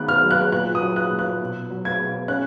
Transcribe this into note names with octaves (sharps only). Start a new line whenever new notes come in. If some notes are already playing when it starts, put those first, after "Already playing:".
Already playing: D#3 B3 F#6
F6
F#3
F#6
A#2 F#6
D#6
F#3
F#6
A#2
F#6
B2
F#3
G#6
B2
C#4 F#6